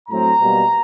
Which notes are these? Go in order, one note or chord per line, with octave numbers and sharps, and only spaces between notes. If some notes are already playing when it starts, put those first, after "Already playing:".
A2 F#3 A3 C4 A#5
B2 G3 A#3